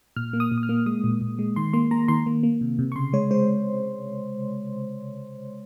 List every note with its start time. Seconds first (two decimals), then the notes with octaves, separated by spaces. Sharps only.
0.16 A#2 F6
0.33 A#3
0.40 D#6
0.52 A#2
0.58 D#6
0.63 F6
0.69 A#3
0.86 G#3 D#6
1.04 A#2
1.21 A#2
1.39 G#3
1.56 D#3 C6
1.73 A#3 C6
1.91 A#3 A#5
2.08 D#3 C6
2.26 A#3
2.43 A#3
2.61 C3
2.79 C3
2.92 C#6
2.96 C#3 C6
3.13 G#3 C#5
3.31 G#3 C5